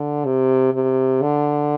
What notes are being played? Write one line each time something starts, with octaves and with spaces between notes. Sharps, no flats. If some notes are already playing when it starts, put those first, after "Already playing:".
Already playing: D3
C3
C3
D3